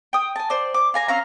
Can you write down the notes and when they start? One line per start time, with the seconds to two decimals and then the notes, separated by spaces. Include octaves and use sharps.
0.13 G5 D#6
0.36 G#5 A5
0.50 C5 D5
0.74 D6
0.94 F5 G#5 A#5
1.08 C4 C#4 F5 A#5